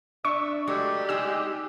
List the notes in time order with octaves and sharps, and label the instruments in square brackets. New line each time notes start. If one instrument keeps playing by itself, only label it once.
[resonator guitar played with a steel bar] D4 [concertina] E5 [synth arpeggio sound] C#6
[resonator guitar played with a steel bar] F#3 G#3 A3 [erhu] G4 [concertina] D5
[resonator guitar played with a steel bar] G#3 D#4 G#4 [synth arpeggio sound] E6